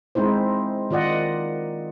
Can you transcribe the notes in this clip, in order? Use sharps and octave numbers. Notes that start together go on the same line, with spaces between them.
G#3 C4 D#4 E4 C5
D#3 F4 D5 D#5 F#5